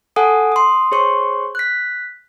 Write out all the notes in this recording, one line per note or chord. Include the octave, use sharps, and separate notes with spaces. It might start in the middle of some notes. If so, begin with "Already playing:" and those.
A4 F#5 G#5 A5 D#6
C6 D#6
G#4 C5 C#5 C6 C#6
F#6 B6